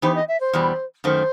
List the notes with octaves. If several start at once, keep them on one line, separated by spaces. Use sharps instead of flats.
E3 B3 D#4 G4 C5
D#5
E5
C5
E2 B2 G3
F#2 D#3 A3 C5